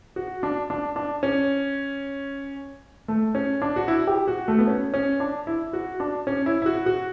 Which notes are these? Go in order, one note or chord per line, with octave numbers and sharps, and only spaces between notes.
F#4
D4
D4
D4
C#4
A3
C#4
D4
F#4
E4
G4
F#4
A3
B3
C#4
C#4
D4
E4
F#4
D4
C#4
E4
E4
F#4
F#4